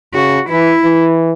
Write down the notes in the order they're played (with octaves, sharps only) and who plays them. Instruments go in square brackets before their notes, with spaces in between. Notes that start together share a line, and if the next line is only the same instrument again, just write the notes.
[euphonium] C#3 [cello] F#4
[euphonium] E3 [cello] E4
[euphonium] E3